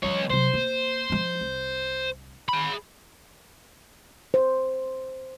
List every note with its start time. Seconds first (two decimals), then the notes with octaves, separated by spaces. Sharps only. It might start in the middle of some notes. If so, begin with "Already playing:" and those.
0.03 C#2 E3 F#3 C#5
0.30 C3 F#3 C5
0.54 A#3
1.10 F3 G#3
1.41 C2
2.49 G#4 B5
4.34 C5